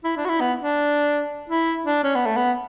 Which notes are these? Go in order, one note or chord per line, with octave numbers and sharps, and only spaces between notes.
E4
D4
F#4
E4
B3
D4
E4
D4
C#4
B3
A3
B3